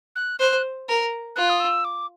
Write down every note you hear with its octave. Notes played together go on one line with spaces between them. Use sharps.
F#6
C5 F#6
A#4
F4 F#6
D#6
E6
D6